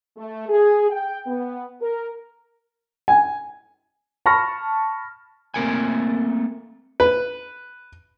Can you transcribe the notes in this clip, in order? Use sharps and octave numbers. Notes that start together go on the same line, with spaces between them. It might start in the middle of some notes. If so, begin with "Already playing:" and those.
A3
G#4
G5
B3
A#4
G#5
A5 B5 C#6 F6 A#6
A3 A#3 C4 A#4 F#5 G#5
B4